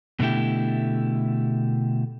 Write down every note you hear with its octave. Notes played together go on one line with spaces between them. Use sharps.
B2 D3 A3 E4 G4